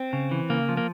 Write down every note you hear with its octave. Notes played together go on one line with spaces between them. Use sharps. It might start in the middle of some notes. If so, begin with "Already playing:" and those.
Already playing: C4
C#3
E3
C#3 A#3
F3
A#3